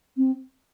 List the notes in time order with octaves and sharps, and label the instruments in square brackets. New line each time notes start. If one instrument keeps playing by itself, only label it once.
[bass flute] C4